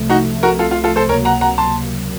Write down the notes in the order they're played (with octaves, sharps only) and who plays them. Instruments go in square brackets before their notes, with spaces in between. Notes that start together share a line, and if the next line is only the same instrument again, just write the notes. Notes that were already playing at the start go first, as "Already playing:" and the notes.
Already playing: [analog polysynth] C2 C3 F3 A3
[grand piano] D#4 F#4
F#4 A#4
F4 A4
F4
F4 A4
A4 C5
[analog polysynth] C#2 C3 F#3 A#3 [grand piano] A#4 C#5
[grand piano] F#5 A#5
F#5 A#5
A5 C6